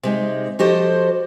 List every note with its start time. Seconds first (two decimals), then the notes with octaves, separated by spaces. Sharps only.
0.03 C3 G#3 D#4
0.59 F3 F#4 G4 A4 C5 D#5